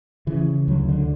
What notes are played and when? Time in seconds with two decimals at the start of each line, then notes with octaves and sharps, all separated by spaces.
0.27 C#3 E3
0.68 D2 F#3
0.89 D3